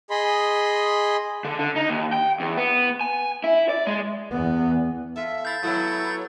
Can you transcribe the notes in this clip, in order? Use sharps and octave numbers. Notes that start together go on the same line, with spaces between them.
G#4 D#5 B5 C6
D3
D3
D#4
D#2
G5
E2
B3
G#5
E4
D5
G#3
E2 B3
F4 A4 E5
E4 F5 G6 A6
F#3 A3 B3 E4